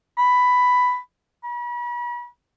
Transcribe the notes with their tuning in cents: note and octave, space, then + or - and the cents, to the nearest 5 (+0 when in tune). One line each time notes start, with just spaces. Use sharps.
B5 +5
B5 -40